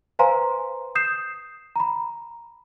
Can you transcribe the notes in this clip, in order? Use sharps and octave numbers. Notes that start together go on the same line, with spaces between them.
B4 C5 F5 G#5 A#5 C6
D#6 G6 C7 E7
A#5 B5